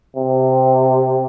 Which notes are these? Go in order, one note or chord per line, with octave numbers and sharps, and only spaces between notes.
C3